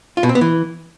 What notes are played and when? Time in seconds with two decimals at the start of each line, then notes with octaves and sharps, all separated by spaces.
0.17 F4
0.23 B2
0.29 C4
0.35 B3
0.41 E3